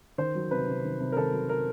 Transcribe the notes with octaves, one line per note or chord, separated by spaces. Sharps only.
D#3 C5
F#3
C3 B4
C3
D#3
C3
A#4
D#3 A4
F#3
C3 A#4